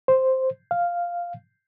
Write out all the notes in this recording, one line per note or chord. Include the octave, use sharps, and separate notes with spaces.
C5
F5